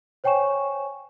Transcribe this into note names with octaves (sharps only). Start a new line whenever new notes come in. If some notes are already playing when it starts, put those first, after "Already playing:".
C5 C#5 G5 G#5 C#6 E7